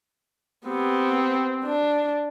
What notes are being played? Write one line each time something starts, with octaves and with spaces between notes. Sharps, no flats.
B3 C4 G4
D4